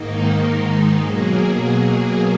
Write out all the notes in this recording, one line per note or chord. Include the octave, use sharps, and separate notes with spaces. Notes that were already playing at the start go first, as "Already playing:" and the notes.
Already playing: G#2 D#3 A#3 D#4
G#2 D#3 G#3
B2 F#3 A#3 G#4